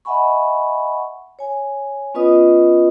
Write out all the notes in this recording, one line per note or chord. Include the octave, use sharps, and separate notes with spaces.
D#5 E5 F#5 G#5 B5 C#6
C#5 G#5
B3 C#4 F4 B4 D#5 D#6